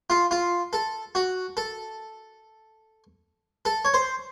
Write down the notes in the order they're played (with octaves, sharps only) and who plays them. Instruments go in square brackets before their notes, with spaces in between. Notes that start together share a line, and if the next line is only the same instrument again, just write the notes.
[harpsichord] F4
F4
A4
F#4
A4
A4
C#5
C5